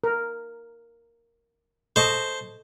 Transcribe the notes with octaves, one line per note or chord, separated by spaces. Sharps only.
A#4
A4 C5 D#5 A5 C#6